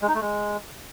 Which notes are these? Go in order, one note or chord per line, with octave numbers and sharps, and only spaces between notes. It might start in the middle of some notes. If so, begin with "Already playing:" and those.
G#3
D#4
A3
G#3